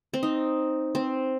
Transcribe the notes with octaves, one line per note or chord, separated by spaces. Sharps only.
C4
D#4
C4